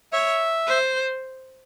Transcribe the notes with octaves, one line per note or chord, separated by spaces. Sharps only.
C#5 E5
C5